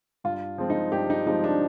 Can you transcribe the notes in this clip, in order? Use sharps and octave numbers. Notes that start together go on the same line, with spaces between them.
G2 F4
F3 G#3 C4
D#4
G2 G4
D#4
F3 G#3 C4 D#4
D4